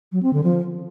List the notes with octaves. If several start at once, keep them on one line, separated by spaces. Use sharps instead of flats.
F#3
C4
D3
F3